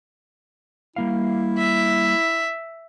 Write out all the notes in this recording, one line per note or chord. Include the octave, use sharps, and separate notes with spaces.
G3 A#3 E4 F5
E5